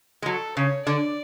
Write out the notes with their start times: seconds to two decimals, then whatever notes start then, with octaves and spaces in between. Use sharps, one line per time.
0.22 G#3
0.26 F#3 A4
0.57 C#3 C#5
0.87 D3 D5